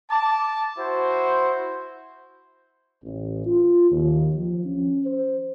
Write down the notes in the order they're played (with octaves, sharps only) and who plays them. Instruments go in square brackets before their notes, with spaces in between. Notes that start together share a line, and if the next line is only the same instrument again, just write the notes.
[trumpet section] A5 D6
E4 F#4 C5
[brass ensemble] A1
F4
D#2
F3
C#4
C5